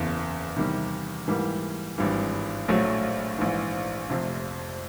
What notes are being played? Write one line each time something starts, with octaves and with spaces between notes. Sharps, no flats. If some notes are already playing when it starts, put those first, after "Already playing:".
Already playing: F#1 E2 C#3
E2 C3 D#3 G3
G#2 E3 G3 A#3
G#1 G2 E3 G3
A#1 A2 F#3 A3
A#1 G#2 E3
F1 F2 C3